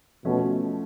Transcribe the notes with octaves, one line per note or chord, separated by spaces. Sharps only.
B2 F3 A3 C#4